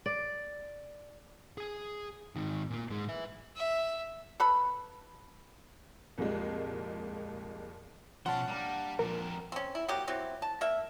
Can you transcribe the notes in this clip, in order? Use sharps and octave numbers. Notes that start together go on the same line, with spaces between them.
D5
G#4 G#5
G#2 D#3
A#2 A#3
G#2 G#3
B4 E5
E5
A4 B4 B5
C2 F2 A#2 G3 G#3
B2 F3 C#4 F#5 A5 C6
G3 A#3 D4 A#4
F2 A#2 F3 D4 A#4
C4 C#4
E4
F#3 A#3 G4
E3 F#3 C4
A5
A#3 E5